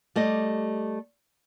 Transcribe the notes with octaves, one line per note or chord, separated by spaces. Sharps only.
G3 A3 G4 D#5